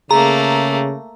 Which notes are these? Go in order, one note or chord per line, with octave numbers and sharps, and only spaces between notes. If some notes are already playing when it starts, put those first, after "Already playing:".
C#3 A3 A#3 G#4 A#5